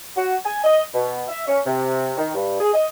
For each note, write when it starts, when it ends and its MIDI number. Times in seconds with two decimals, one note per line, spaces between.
0.17 0.35 66
0.45 0.63 80
0.64 0.82 75
0.94 1.23 47
1.29 1.47 76
1.48 1.60 61
1.66 2.12 48
2.17 2.32 51
2.35 2.56 43
2.60 2.70 68
2.74 2.86 75